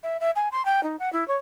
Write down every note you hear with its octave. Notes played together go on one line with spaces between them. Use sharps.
E5
E5
G#5
C6
G5
D#4
F#5
E4
C#5